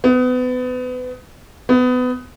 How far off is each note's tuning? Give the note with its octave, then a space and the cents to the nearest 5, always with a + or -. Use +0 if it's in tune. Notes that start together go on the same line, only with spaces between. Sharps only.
B3 +30
B3 +25